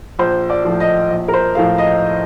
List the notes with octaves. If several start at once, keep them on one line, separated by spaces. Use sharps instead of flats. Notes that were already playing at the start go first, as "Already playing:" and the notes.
A#1 C5
D5
A2 F3
D#5
A#1
A#4
C5
A2 F3 A3 F5
D#5